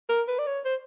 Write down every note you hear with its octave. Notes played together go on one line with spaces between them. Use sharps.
A#4
B4
D5
C#5
C5